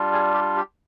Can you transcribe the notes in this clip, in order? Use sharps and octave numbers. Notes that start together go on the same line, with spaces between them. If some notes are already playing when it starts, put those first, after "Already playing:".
Already playing: G3 D4 F4
G#4
G4
G4